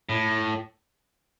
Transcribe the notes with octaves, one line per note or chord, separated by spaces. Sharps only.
A2